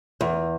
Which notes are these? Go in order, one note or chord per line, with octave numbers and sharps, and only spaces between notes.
E2